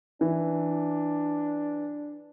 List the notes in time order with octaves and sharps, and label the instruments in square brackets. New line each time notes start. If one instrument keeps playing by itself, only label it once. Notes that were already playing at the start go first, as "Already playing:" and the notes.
[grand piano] E3 [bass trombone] D4